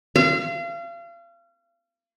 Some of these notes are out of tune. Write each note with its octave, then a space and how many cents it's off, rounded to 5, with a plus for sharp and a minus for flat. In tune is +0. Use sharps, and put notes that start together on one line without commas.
F5 -35